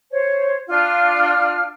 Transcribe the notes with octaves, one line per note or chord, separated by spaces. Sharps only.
C5 C#5
D4 F4 F6